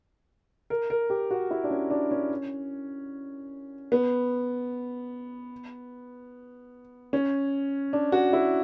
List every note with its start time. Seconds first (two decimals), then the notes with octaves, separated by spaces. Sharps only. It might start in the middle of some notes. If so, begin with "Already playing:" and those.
0.70 A#4
0.90 A#4
1.10 G4
1.31 F#4
1.51 E4
1.64 D4
1.71 C#4
1.90 D4
2.11 C#4
3.92 B3
7.13 C#4
7.93 D4
8.12 F#4
8.33 E4